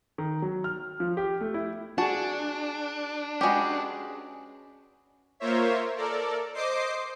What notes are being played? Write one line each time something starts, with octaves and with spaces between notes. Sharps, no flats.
D#3
F#3
F6
F3
G4
A3
E4
D4 F#4 G#4 A5
G#3 C#4 F#4 G4 B4
A#3 F4 A#4 C5 C#5 E5
A4 A#4 D5
C5 D#5 D6 C7